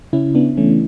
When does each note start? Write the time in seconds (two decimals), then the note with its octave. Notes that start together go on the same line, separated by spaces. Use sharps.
0.13 C#3 C#4 E4
0.35 B3 D4
0.57 E3 A3 C#4